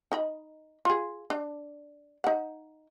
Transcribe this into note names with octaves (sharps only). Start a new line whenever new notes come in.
D#4 D#5 B5
F4 G#4
D4
D#4 F#5